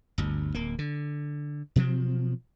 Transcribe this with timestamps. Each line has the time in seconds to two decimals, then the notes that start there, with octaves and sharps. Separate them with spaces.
0.18 G1 D2
0.54 D1 A#3
0.79 D3
1.76 B2 F3 F#3 C4